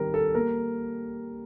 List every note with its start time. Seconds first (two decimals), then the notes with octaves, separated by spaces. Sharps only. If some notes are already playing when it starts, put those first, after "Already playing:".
Already playing: D#3 G3 C4 A#4
0.14 A4
0.35 A#3 A#4